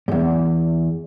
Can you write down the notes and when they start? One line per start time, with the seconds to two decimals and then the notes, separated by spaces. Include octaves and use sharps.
0.08 E2 G2